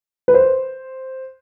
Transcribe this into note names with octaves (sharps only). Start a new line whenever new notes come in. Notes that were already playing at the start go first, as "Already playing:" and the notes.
B4
C5